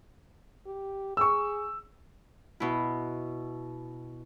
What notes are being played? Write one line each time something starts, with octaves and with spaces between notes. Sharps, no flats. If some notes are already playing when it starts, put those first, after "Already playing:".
G4
G#4 C#6 E6
B2 E4